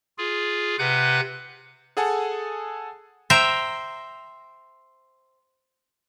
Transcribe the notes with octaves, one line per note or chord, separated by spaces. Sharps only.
F4 G#4
C3 B4 F#5 F#6 G6
G#4 A4 F#5 G#5 A5
C5 E5 G5 A#5